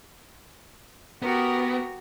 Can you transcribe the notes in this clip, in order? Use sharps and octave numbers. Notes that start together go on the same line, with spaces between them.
B3 F#4 G4 A#4